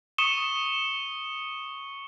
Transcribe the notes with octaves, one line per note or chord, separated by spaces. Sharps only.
C#6 D#6 C#7 E7 G7